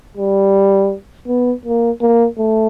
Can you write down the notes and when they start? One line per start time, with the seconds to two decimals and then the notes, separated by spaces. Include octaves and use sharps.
0.17 G3
1.27 B3
1.65 A#3
2.01 A#3
2.38 A3